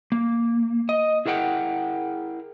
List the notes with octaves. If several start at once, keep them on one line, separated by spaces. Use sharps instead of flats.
A#3
D#5
E4 G#4 A#4 F#5 G5